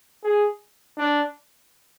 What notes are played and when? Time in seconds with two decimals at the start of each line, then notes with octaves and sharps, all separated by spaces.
0.24 G#4
0.98 D4